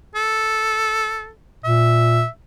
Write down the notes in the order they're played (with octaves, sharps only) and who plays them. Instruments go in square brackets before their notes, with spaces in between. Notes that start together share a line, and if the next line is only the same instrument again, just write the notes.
[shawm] A4
[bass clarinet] A#2 [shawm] E5